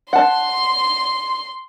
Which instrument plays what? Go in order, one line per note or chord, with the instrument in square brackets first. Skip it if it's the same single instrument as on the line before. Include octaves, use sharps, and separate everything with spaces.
[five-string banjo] F#5 A5 [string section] C6